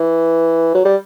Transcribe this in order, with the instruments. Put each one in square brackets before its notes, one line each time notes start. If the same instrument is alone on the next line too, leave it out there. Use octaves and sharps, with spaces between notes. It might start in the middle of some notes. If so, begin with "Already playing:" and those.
Already playing: [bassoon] E3
F#3
G3